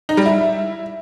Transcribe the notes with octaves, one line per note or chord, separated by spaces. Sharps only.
D#4
G3
E4